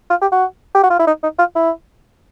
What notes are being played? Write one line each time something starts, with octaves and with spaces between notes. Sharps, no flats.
F4
G4
F#4
G4
F#4
F4
E4
D#4
D#4
F4
E4